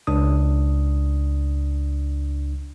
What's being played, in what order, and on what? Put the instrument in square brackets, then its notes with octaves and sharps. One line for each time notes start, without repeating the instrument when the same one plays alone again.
[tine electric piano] C#2 D4 D#6